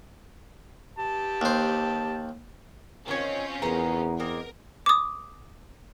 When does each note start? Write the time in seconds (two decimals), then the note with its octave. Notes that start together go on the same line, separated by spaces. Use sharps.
0.99 G4 A5
1.42 D#2 C5
3.08 D#3 C4 C#4 F4 C#5
3.62 E2 B3 G#4 A#4 A#5
4.20 A#3 C4 A#4 D#5
4.86 D6 D#6